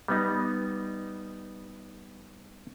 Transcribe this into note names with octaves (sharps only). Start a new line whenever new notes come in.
G3 B3 D#4